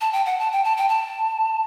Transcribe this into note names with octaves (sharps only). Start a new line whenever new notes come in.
A5
G5
F#5
A5
G5
A5
G5
A5